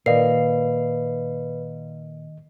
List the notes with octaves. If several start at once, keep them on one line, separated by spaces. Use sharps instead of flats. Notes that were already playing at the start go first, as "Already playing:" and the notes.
A#2 D#3 A#4 B4 D5 D#5 F5 C7